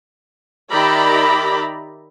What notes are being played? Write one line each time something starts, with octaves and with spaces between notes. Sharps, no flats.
D#3 G4 D5 E5 A#5 B5